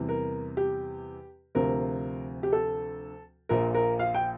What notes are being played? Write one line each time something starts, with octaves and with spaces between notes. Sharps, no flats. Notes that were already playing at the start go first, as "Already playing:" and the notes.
Already playing: E2 C3 E3 G3
A#4
G4
D2 C3 F3 A#4
G4
A4
A#1 A#2 F3 A#4
A#4
F5
G5